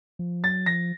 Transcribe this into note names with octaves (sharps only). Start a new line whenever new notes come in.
F3
F#3 A6
F3 A#6